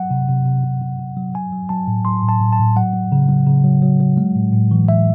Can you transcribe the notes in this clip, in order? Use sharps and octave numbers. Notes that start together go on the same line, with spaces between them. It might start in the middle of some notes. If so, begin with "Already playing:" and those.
Already playing: F#3 F#5
C3
C3
C3
C3
C3
C3
F#3
F#3 G#5
F#3
F#3 A5
A2
F#3 C6
A2
A5
A2
A5
A2
F#3 F#5
F#3
C#3
F#3
C#3
F#3
F#3
F#3
G#3
A2
A2
E3
A2 E5